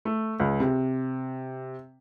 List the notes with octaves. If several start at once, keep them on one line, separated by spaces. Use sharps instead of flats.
A3
C#2
C3